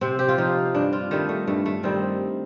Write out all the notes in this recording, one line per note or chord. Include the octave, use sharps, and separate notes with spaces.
C3 C4
G4
F4
F3 D#4
G2 D4
F4
D#3 G3 A3
A3
G2 A3
A3
D#3 G3 C4